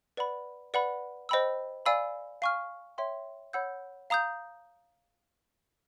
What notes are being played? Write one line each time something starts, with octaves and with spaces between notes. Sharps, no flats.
B4 D5 F#5 B5
B4 D5 F#5 B5
C5 D#5 G5 B5 E6
D5 F5 G#5 B5 E6
F5 G#5 C#6 F6
C#5 E5 G5 C6
C#5 F#5 B5 E6 G6
F5 A#5 D#6 G6